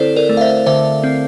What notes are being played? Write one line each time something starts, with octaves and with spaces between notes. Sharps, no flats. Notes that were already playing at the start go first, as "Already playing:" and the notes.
Already playing: D3 C4 E4 A4 C5 D5
A#4 D5
A3
F5
C5 E5
D3 C5 E5
C4